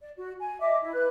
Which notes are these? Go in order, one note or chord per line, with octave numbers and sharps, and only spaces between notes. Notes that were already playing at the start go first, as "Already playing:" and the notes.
D5
F#4
G#5
D#5 E5 D6
E4
B4 F#6